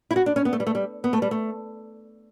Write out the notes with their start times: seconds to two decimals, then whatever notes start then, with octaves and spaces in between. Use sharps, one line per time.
0.11 E4
0.16 F#4
0.26 D4
0.36 C#4
0.45 B3
0.53 A3
0.60 G3
0.67 A3
0.75 G3
1.04 B3
1.13 A3
1.22 G3
1.31 A3